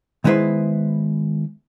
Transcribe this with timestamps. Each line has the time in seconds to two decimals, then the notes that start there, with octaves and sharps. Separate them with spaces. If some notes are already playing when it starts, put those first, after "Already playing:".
0.24 D#3 G#3 B3 E4 B4 C5